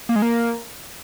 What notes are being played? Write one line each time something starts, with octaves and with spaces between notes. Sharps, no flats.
A#3
G#3
A#3